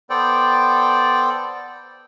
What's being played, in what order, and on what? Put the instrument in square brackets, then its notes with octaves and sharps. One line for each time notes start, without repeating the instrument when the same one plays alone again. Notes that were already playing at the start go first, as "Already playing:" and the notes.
[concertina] B3 A4 C5 D5 G5